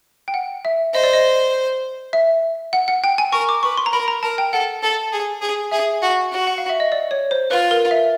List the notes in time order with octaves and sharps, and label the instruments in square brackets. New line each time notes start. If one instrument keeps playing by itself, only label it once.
[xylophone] G5
F#5
E5
[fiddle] C5 [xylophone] D#5
[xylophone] D5
D#5
E5
F#5
F#5
G5
G#5
[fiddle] A#4 [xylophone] C#6
[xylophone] D6
[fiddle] B4 [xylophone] C#6
[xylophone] C6
A#5
[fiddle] A#4 [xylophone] B5
[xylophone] A#5
[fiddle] A#4 [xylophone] A5
[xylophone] G5
[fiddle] A4 [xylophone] F#5
[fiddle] A4
G#4
G#4
[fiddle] G#4 [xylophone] E5
[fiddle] F#4
F#4
[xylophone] F#5
F5
E5
D#5
D5
C#5
C5
[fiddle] F4 [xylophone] B4
[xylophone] A#4
E5